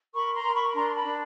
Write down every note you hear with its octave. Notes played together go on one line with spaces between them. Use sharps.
A#4 B5 C#6
A#5 C6
A#4
B5 C#6
B5
D4 A#5 C6
A5 B5
D4